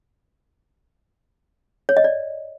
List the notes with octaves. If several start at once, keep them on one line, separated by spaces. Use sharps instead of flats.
C#5
D#5
D5